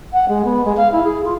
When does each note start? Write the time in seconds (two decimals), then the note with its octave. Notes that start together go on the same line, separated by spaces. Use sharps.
0.13 F#5
0.28 G#3
0.45 B3
0.65 G#3
0.77 F5
0.92 E4
1.04 G#4
1.24 F4